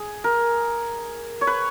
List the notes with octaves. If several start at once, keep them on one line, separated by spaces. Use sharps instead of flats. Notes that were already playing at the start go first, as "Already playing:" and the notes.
Already playing: G#4
A#4
C#5
B4